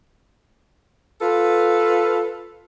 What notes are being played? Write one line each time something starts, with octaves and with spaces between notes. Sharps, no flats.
F4 A4 B4